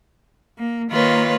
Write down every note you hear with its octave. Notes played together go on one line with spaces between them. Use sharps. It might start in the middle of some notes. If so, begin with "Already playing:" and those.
A#3
D#3 A#3 F4 B4 C#5